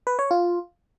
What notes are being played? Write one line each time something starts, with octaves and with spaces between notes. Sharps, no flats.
B4
C#5
F4